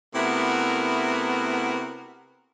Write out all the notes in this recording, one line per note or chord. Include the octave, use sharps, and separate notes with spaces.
C3 A3 B3 E4 F#4 A#4